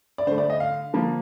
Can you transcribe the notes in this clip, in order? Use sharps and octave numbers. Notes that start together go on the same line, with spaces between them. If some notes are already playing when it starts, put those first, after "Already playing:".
D5
D3 A3 C5
D5
D#5
F5
D3 F3 A#3